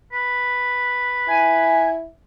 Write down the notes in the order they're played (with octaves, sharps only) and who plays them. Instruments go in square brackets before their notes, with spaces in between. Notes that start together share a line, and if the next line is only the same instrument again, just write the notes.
[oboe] B4
[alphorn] E4 [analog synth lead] G#5